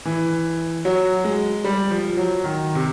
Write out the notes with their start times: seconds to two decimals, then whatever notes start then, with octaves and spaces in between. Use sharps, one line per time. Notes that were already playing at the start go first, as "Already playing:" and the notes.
0.05 E3
0.85 F#3
1.24 G#3
1.64 G3
1.91 F3
2.17 F#3
2.44 D#3
2.75 C3